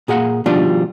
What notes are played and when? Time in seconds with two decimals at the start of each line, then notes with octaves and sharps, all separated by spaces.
0.08 A#2 G#4 F5 F#5
0.46 B2 D#3 F3 G3 D4 F4